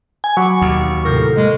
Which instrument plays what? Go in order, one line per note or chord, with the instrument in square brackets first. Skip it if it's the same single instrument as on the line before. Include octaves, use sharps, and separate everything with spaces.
[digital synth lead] G#5
[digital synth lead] F#3 [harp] B5 D6 [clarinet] C#6
[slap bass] D#2 [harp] B2
[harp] A2 C3 C5 [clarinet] A#4
[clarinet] G#3 [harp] A#3